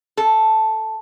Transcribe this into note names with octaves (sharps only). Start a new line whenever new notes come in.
A4